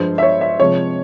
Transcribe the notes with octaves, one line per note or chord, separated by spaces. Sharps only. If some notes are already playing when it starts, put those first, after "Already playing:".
Already playing: G2 F3 G#3 C5
E5
C#5
E5
C3 F3 G#3 C#5